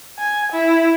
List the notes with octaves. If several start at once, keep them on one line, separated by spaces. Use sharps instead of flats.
G#5
E4